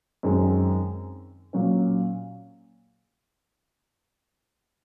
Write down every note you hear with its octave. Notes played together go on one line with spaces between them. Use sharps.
F#2 D#3 G#3 C4
A#2 F#3 C#4